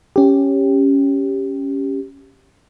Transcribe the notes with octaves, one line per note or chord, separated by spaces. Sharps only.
C#4 G4